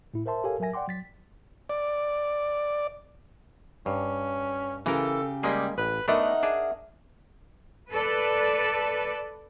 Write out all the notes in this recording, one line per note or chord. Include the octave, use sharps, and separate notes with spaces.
A2 E4
A#4 C5 E5 A5 C6
G4 A4 A#4 C#5 F5 G#5
F#3 A#4 E5 G#5 A#6
D5 F#5 G5 C6 D6
F#3 A6 B6
D5
G2 C#4
C#3 E3 G4 A4 A#4
G3 G#3 A#3 G#4
A1 B4
A3 B3 D4 D#4 A#4 E5 F#5
D4 G#4
A4 B4 D5